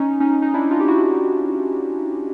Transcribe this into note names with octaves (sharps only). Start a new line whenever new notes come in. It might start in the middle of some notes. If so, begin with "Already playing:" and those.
Already playing: C#4 D#4
C#4 D#4
D#4
D4 E4
D#4 F4
G4
E4 F#4